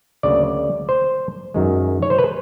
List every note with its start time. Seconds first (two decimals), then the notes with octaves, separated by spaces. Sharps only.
0.23 D2 C#3 F#3 A#3 D5
0.89 C5
1.54 F#2 D#3 G#3
2.02 C#5
2.10 C5
2.19 B4